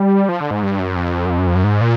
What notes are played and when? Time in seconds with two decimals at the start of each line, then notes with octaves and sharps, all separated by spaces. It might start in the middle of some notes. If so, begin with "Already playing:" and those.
Already playing: G3
0.29 F3
0.40 D3
0.51 G#2
0.63 G2
0.79 F#2
0.96 F2
1.26 F#2
1.30 F2
1.39 F#2
1.47 F2
1.55 F#2
1.64 G#2
1.81 A#2